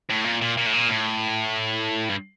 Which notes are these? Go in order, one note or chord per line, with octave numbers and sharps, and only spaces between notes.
A2
A#2
A#2
A#2
A2
A#2
A2
G2